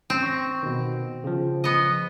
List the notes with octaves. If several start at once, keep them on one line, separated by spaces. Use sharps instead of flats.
C4 C#4
C#6 A#6
B2 D#3
C#3 F3
B3 D#5